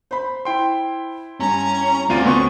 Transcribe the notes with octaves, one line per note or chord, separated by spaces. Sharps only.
C5 B5
E4 G5 C6
G2 C#4 A#5
D2 C4 C#4 F4 D5 D#7
D2 B3 C#6